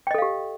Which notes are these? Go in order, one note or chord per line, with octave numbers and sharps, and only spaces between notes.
G4 A4 D#5 F5 G5